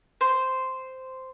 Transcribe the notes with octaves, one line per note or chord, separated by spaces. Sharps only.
C5